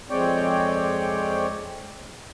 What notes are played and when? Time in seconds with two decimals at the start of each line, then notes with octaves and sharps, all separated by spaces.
0.10 F2 G#3 C4 C#5 D5 G5